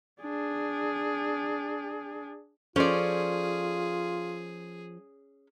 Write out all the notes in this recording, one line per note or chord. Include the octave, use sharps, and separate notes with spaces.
D4 G#4
F3 C#4 F4 G#4 A4 C5 D5